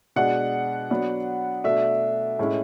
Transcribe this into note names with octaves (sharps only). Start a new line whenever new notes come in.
B2 G#3 D4 F#5
F#3 B3 D4
B2 A3 D4 E5
A2 G#3 C#4 E4